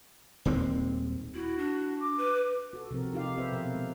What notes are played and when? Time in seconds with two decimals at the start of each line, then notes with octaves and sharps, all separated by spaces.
0.45 D#1 D#2 G#3 C4
1.35 E4 F#4
1.58 D4
2.00 D6
2.18 B4
2.73 F#4 A4
2.91 C3 F3 C4 A#4
3.13 D#4 F4 G4 F5
3.37 C4 G#4 A4 B4 C5 E5
3.52 B2 F3 A#4 F5
3.75 G#3